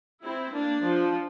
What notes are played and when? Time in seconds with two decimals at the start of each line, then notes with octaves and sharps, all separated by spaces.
0.22 C4 E4
0.53 A#3 D4
0.83 F3